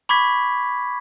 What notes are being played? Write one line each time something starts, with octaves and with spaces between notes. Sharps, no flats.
B5 C#6 D6 G#6 B6